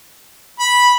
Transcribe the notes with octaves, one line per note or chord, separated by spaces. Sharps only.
B5